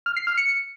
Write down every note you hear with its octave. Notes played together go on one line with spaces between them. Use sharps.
F6
C7
F6
C#7